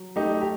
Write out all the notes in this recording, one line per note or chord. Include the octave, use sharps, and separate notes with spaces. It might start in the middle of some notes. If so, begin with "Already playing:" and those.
Already playing: F#3
A3 D#4 G4
G4